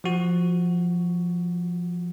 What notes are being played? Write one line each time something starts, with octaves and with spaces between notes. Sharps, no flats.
F3 F#4